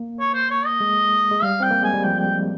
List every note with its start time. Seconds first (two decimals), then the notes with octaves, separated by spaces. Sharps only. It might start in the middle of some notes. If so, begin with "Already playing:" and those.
Already playing: A#3
0.20 C#5
0.34 C5
0.50 C#5
0.66 D#5
0.81 G#3
1.31 G#3
1.42 G3 F5
1.60 C4 G5
1.71 A#3
1.82 G#3 G#5
1.93 G3
2.04 F3 G5
2.19 G5